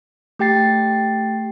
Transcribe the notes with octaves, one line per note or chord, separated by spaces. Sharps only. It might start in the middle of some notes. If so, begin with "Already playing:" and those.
A3 G4 G5 A6 C7